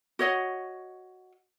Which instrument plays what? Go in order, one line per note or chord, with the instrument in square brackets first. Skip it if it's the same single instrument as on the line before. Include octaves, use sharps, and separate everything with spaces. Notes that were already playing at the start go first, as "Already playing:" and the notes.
[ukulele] F#4 C#5 D#5 F#5